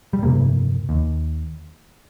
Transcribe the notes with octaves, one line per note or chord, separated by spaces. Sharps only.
G3
G1 F2 C3 A#3
D#2